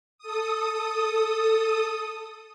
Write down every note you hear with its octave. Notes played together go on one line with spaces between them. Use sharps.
A4 D#6